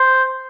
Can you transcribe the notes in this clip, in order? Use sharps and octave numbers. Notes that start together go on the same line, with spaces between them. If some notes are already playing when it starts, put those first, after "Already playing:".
Already playing: C5